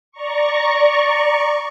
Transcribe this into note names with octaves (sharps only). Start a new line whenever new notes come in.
D5 A#5 C#6